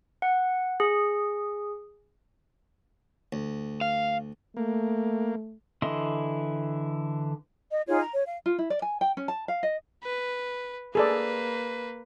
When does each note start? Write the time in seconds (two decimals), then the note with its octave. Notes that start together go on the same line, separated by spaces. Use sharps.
0.22 F#5
0.80 G#4
3.33 D2
3.81 F5
4.57 A3 A#3
5.82 D3 E3 E4 D#5 C6
7.71 D#5
7.88 D#4 F4 G#4 C#5
8.01 A#5
8.14 C#5
8.26 F5
8.46 F4
8.59 E4
8.70 D5
8.82 G#5
9.01 G5
9.17 C#4
9.28 A5
9.48 F5
9.63 D#5
10.03 B4
10.95 A#3 G#4 A4 B4 D5